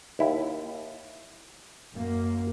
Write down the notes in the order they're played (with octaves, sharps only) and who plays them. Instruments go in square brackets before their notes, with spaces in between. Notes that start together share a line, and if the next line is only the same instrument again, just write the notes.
[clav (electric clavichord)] D#2 E4
[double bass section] F#2 A#3